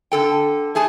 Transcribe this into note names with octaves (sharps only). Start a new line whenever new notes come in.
D3 A4 G5
A3 G#4 G#5 A5